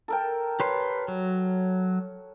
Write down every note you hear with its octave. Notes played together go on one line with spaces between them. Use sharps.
A4 A#4 G5
G4 B4 C#5 C6
F#3